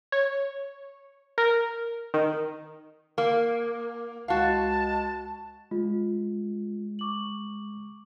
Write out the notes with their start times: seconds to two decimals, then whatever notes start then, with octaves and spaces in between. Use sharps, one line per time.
0.12 C#5
1.38 A#4
2.14 D#3
3.18 A#3
4.28 C#2 G#3 F#4 F5 A5
5.71 G#3 F4
6.99 C#6 D6 F#7